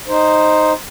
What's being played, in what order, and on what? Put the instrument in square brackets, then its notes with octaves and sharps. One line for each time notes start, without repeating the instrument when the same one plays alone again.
[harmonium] D#4 C5